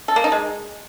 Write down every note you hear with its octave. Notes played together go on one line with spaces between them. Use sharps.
A4
A#3
D#4
G#3